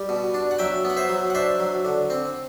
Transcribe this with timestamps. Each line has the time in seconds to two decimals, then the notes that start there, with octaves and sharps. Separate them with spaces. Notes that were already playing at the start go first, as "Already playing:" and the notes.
Already playing: G3
0.09 B2
0.34 D4
0.51 F#5
0.59 F#3 E5 G5
0.85 B3
0.90 F#5
0.97 C5 E5
1.09 F#3
1.30 F#5
1.35 D4 C5 E5
1.60 F#3
1.85 D3
2.10 C4